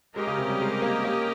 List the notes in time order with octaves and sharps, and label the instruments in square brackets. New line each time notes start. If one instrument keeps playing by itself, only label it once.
[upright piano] G#3 [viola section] C#4 G4 A#4 D#5
[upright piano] C#3
C3
G3
G#3
A#3
A#3